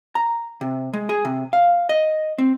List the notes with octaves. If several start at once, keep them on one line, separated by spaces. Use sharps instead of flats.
A#5
C3
G#3
G#4
C3
F5
D#5
C4